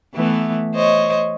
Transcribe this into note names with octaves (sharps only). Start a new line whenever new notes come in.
E3 A3 B3
C5 C#5 D#5